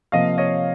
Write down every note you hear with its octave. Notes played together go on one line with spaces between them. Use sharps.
C3 F3 A#3 D#5 F5
C#5 D#5